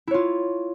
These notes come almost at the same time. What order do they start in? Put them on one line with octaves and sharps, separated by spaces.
E4 C#5 F4